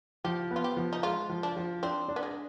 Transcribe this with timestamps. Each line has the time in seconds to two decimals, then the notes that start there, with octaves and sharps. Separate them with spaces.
0.24 F3 G4
0.51 B3
0.56 F4
0.64 G4
0.77 F3
0.93 D#4
1.03 G#3 F4
1.29 F3
1.43 D4
1.57 F3
1.83 C4 D4
2.08 D4
2.16 B3
2.23 G#3